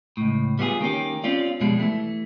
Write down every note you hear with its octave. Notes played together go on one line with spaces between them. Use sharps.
C#2 A2
G3 B3 F4 F#4 G#4
D#3 A#3 C#4 G4
C4 C#4 F4 D5
F2 B2 G3 G#3
E3 A3